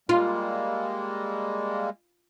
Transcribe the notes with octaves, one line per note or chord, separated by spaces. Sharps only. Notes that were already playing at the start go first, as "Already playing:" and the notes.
G3 G#3 A#3 F4